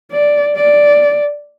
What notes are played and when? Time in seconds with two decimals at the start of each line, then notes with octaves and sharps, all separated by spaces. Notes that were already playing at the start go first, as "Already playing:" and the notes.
0.12 D5
0.55 D5